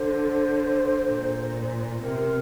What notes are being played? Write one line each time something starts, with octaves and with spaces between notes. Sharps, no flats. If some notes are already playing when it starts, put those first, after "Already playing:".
Already playing: D3 C5
A#2
C3 A#4